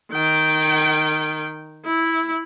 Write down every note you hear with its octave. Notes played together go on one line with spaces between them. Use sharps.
D#3 G5
E4